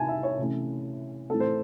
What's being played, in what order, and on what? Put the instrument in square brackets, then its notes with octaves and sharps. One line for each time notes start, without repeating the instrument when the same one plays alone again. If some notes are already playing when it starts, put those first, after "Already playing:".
Already playing: [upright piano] C3 E3 G#5 A5
E5
C#5
C3 E3 A3 C#4
A2 E3 C4 A4
C5